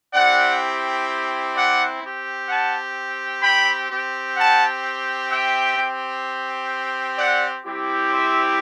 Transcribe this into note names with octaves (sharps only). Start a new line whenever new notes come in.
C4 E4 G4 D5 F#5
D5 F#5
C4 G4
F#5 A5
G5 B5
C4 G4
F#5 A5
E5 G5
C4 G4
D5 F#5
G3 C4 E4 G4
C5 E5